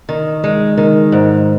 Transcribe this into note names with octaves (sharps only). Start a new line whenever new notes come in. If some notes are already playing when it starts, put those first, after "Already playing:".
D#3
G#3
D#3
G#2